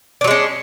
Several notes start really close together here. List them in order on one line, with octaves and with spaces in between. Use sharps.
D4 F#3 G#3 C#4